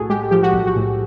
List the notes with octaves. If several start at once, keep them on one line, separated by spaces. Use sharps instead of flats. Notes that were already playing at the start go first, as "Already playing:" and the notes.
Already playing: B1 A2 F#4 G#4 A4
G#3 G4
F3 G4
F#4
B1
F#4
A2